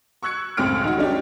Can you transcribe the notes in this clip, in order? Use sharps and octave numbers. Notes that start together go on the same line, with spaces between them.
C#6 E6 F#6 G#6 C#7
C#2 F#2 A2 C4 F6 D7
D#3 F#4
F#3 G#3 C#4 D4 G4